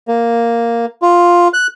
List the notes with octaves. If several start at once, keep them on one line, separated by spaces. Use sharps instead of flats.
A#3
F4
F#6